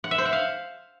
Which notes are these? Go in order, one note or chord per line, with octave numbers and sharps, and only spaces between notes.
F#5
E5
C5
F#5
F5